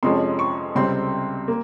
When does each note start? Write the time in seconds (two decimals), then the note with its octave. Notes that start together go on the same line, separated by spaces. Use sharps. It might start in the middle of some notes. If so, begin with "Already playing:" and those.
0.03 F2 C3 F3 G#3 C#4 C6
0.39 C#6
0.75 C#2 C3 G3 C4 C6
1.48 A#3